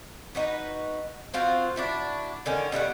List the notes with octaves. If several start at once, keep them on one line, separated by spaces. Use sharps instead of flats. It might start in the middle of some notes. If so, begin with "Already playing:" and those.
D#4 F#4 B4
C4 F4 F#4 F5
D4 E4 F#4
D3 D#3 C#4
B2 G3 A3 F#5